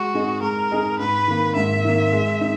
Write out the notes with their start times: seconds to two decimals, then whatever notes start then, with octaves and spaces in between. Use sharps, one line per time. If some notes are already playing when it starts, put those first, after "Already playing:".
Already playing: G#3 F#4
0.15 D#4 G#4 D#5
0.42 G#3 A#4
0.72 D#4 G#4 D#5
0.99 G#2 B4
1.28 D#3 A#3
1.56 G#2 E5
1.85 D#3 A#3
2.13 G#3
2.41 D#4